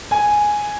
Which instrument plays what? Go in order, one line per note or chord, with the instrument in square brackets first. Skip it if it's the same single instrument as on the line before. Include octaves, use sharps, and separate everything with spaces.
[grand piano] G#5